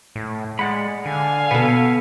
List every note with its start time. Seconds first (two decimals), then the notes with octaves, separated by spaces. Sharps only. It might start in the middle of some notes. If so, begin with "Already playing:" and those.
0.16 A2
0.59 G#3 D5 F#5 B5
1.06 D3 F5 G#5
1.51 B2 B3 A4